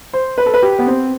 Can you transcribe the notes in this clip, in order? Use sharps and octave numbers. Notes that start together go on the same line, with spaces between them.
C5
B4
A4
B4
G4
B3
C4